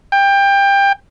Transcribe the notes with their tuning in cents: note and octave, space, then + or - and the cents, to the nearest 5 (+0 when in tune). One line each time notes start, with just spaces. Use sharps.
G5 +20